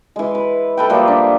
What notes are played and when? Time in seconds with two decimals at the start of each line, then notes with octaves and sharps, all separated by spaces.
0.16 E3 G#3
0.35 B4
0.77 A4 B4 G5
0.90 F3 G3 A#3 E5
1.08 D4